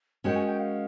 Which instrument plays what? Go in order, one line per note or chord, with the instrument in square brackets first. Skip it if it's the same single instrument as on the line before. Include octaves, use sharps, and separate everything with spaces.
[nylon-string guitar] G#3 C#4 F#4 A#4 C#5 [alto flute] G5
[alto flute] G#5
G5
F5